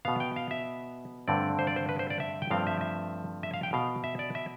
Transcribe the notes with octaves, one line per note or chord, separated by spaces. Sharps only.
B2 B3 F5
G5
F5
E5
G2 D3 A3 C4 D5
C5
D5
C5
B4
C5
D5
E5
G5
G2 F3 A3 C4 F5
E5
E5
E5
F5
G5
B2 B3 F5
E5
D5
E5